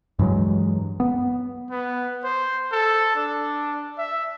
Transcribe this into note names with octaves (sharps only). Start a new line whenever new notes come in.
G2 E3 F#3 G#3
B3
B3
C5
A4
D4
E5